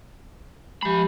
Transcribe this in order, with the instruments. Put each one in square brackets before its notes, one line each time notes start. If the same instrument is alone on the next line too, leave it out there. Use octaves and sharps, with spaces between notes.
[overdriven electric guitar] F3 B5 [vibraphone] G#3 G4